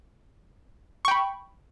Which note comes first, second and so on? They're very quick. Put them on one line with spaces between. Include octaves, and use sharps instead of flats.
C#6 G5 B5